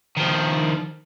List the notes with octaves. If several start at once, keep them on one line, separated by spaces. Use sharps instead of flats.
D#3 F3